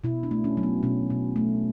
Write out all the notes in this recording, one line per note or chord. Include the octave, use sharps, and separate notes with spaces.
B2 E4
D4
A3
C#4
F#3
B3
B2 C#4
B2
A3